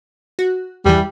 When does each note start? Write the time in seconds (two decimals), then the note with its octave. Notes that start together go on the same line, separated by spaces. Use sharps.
0.39 F#4
0.86 E2 G2 E3 G3